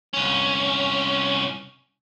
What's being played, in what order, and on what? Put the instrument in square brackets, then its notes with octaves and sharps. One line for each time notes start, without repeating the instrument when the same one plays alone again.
[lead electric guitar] C2 C#4